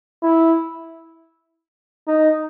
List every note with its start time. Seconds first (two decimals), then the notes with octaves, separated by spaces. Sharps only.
0.23 E4
2.08 D#4